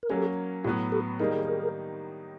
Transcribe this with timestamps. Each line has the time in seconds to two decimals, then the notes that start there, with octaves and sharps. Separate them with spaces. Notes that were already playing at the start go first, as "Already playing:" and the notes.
0.03 A#4
0.10 F#3 A#3 C#4 G4 A4
0.64 A2 F#3 B3 F4 G4
0.92 G4 A4
1.20 D#3 G3 A#3 D#4 G#4 A#4